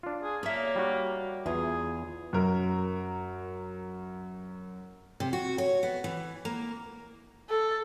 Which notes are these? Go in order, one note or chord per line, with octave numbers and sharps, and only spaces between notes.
D4 F4
G#4
A#3 C#5 E5
G3 F#4
E2 F4 G#4 G#5
F#2 A#4
C3
F#4
C#5
B3
E3
A#3
A4